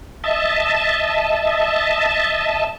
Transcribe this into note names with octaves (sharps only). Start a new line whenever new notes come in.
D#5 E5 A5